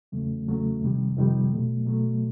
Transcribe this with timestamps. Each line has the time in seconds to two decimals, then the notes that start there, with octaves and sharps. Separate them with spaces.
0.12 E2 C#3 F#3 A3
0.47 E2 C#3 F#3 A3
0.81 F2 C3 D#3 G3
1.17 F2 C3 D#3 G3
1.50 B2 F#3 A3
1.85 B2 F#3 A3